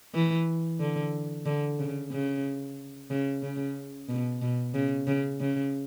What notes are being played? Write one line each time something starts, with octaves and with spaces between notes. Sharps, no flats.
E3
D3
D3
C#3
C#3
C#3
C#3
B2
B2
C#3
C#3
C#3